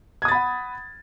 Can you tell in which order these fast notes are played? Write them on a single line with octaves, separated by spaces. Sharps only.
G#6 D#6 A6 B5 F#5